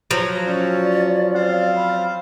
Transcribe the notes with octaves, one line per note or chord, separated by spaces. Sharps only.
F3 F#3
C#4 D5
C4 C5 F5
B5